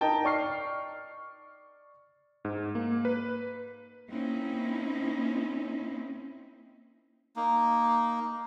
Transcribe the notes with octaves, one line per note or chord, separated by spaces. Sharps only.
D#4 A#4 D#5 G5 A5
D5 C#6 F6 C7
G#2
A#3
B4
A#3 C4 C#4 D#4 E4
A#3 D#4